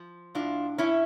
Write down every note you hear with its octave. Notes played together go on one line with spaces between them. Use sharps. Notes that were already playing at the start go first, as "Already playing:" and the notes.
Already playing: F3
A2 D4 F4
A2 C#4 E4